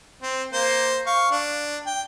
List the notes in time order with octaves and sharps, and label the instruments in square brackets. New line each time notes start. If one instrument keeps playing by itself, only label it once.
[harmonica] C4
A#3 C5
F5 C#6
D4
G5